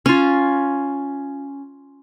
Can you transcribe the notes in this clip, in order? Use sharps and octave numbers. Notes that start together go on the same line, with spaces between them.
C#4 F4